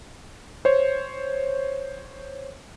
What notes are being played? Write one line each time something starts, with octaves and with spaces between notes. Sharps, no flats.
C5 C#5